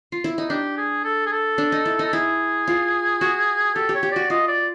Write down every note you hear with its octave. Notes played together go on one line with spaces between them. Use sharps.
F4
E4
D#4
D4 G4
G#4
A4
G#4
A4
D4
D#4
E4
D#4 A4
E4 G#4
F4
F#4
G4 A4
G4
C#5
G4
F#4 D5
F4 D#5
D5